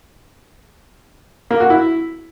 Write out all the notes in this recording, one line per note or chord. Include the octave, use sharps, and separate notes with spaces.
A#3
F#4
E4